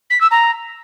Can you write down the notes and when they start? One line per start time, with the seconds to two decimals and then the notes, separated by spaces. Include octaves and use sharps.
0.10 B6
0.20 E6
0.31 A#5